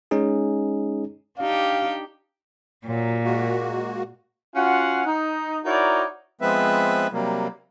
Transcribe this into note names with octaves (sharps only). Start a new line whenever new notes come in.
G#3 C#4 D#4 G#4
D4 D#4 G4 F5
A#2 F#3
G#3 A#3 F#4
C#4 F4 F#4 F5 F#5
D#4
D#4 E4 F#4 A#4 C#5 D5
F3 G#3 B3 C4 B4 E5
C3 F#3 G3 A#3